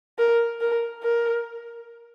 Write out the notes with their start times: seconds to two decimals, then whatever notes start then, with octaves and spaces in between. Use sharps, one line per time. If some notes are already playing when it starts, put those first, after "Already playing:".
0.19 A#4
0.61 A#4
1.03 A#4